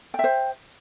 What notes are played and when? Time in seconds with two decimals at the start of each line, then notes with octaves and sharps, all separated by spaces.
0.14 G5
0.19 E5
0.24 C5